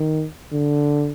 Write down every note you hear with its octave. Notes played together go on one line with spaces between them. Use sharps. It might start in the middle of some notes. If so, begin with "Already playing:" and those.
Already playing: D#3
D3